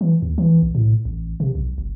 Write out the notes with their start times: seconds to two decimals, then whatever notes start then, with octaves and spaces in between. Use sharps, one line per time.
0.01 E3
0.22 D#2
0.38 E3
0.62 A#1
0.75 A2
1.05 A1
1.40 C3
1.55 B1
1.78 F#1